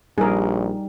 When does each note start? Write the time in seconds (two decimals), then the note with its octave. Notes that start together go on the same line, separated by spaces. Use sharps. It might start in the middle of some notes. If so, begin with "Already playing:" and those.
0.18 A#1 G3 D#4 G#4 A#4